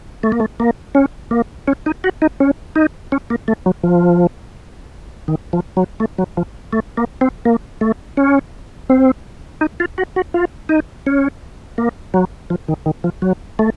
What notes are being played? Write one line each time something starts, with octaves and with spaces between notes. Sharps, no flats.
A3
A#3
A3
A#3
C#4
A#3
C#4
D#4
F#4
D#4
C#4
D#4
C#4
A#3
A3
F#3
F3
D#3
F3
F#3
A3
F#3
F3
A3
A#3
C4
A#3
A3
C#4
C4
D#4
F4
F#4
F#4
F4
D#4
C#4
A#3
F#3
F3
D#3
D#3
F3
F#3
A3